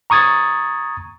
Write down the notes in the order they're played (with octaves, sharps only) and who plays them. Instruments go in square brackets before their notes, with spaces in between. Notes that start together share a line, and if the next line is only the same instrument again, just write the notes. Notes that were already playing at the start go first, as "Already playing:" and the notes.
[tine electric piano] A#5 C#6 D#6 G#6 A6